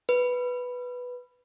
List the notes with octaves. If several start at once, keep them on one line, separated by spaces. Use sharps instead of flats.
B4